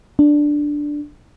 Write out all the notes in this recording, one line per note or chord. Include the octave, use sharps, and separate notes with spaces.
D4